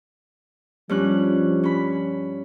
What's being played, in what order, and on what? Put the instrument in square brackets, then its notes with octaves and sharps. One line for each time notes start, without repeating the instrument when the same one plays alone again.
[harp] G2 C#4 F#6 [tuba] F3
[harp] C#4 B5